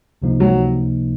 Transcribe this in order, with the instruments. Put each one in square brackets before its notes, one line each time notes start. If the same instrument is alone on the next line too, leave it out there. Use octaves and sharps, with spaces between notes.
[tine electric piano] C#2 C3 F3 A#3 D#4
[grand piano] F#3